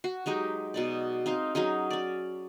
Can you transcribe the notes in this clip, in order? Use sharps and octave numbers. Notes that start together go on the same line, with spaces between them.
F#4
F#3 G#3 D#4 G4
B2 D#4 D5
C4 D#4 F5
F#3 C#4 D#4 G#4
C#4 D5